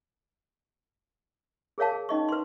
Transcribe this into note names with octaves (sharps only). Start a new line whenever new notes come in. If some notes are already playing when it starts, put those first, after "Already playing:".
G#4 A#4 C#5 F5 A5
G#4
C#4 D#4 D#5 C#6
B4 C6